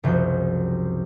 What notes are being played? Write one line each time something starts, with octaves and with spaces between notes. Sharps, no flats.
F#1 C2 F3 F#4 G6